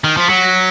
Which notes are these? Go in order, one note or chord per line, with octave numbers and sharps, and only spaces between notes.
D#3
F3 B6
F#3 C#7
A#6